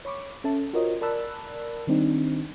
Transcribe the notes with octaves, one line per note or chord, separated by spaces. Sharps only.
C#5 B5 C#6 D6
C#4 A4 E5 A5
F4 F#4 A#4 C5 C#5 D#5
A#4 D5 A5 B5 E6 F#6
D#3 G3 C4 D4 D#4